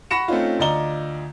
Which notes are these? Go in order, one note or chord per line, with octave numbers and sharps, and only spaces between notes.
F#5 B5 C#6 A#6 C#7 E7
A3 C4 C#4 D#4 F4
D2 F4 D5 D#5 A#5 G7